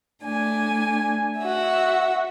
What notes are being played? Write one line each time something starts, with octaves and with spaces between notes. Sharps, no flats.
A3 D4 G#5
F#4 E5